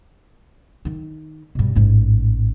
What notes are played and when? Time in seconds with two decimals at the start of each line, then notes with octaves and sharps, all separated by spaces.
0.85 D#3 D#4
1.55 G2 B2
1.75 A1 G#2